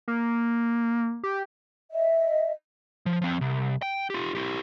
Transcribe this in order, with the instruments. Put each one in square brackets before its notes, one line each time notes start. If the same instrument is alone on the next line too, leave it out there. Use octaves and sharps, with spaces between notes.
[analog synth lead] A#3
G4
[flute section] D#5 E5
[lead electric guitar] F3
F3 C4
C2
G5
F4 G4
E4 G4